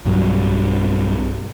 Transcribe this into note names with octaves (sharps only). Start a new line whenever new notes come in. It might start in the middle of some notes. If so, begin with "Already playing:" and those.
B1 G2 F#3